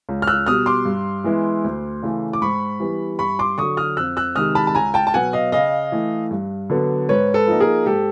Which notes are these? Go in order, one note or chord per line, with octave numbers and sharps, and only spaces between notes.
C#2
F6
E6 F#6
B2 G3 D#6 F6
C6 D6
G2
E3 G#3 B3 E4
D2
C#3 E3 A3
D6
G#2 B5 C#6
E3 G3 B3
G2 B5 C#6
C6 D6
D3 F#3 C#6 D#6
D#6 F6
F2 E6 F#6
E6 F#6
C3 D#3 G#3 D#6 F6
A5 B5
A5
C#2 G#5 A#5
G5 A5
A5
B2 F#3 B3 F#5 G#5
D#5 F5
C#3 D#5 F5
E3 A3
G2
D3 F#3 B3 D4
G#2 B4 C#5
A4 B4
F3 A#3 D#4
G#4 A#4
G#2 G4 A4